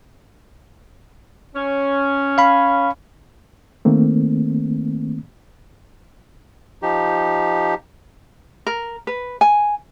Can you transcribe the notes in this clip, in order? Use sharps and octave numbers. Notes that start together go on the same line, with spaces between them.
C#4
F5 B5
D#3 A3 A#3 C4
F3 D#4 G4
A#4
B4
G#5